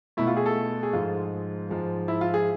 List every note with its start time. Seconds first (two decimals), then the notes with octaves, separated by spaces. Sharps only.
0.17 B2 A3 E4
0.27 F4
0.37 G#4
0.46 A4
0.83 G#4
0.93 G#2 F3 G#3 F4
1.69 G#2 F3 G#3
2.08 E4
2.21 F4
2.34 G#4